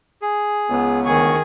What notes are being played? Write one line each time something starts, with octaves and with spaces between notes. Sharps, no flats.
G#4
C#2 B3
D2 D#3 G#4 C#6